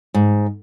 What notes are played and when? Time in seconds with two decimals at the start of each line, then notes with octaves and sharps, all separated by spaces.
0.14 G#2